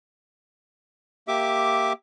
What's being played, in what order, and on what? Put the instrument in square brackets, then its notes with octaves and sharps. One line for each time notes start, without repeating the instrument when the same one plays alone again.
[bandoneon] A#3 G4 E5 D6